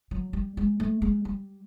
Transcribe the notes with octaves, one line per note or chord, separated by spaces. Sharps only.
F#3
G3
G#3
A3
G#3
G3